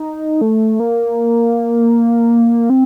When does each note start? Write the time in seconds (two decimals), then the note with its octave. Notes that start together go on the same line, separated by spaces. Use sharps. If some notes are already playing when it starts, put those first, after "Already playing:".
Already playing: D#4
0.41 A3
0.80 A#3
2.70 C4